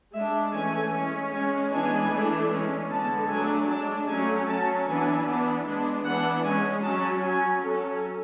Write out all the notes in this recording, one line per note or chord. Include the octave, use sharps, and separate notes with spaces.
G#3 D4 E5
E3 A3 C#4 G#5
G#3 C#4
G#3 C#4 G#5
E3 G#3 B3 D4 G#5
E3 A3 D4
G#3 C#4
D3 G#3 B3 A5
F#3 A3 D4 G#5
G#3 D4 A5
F#3 A3 C#4 G#5
F#3 C#4 A5
E3 B3 D4 G#5
E3 B3 D4
G#3 B3 D4
E3 B3 D4 F#5
G#3 C#4 G#5
F#3 C#4 A5
F#3 C#4 G#5
F#3 C#4 A4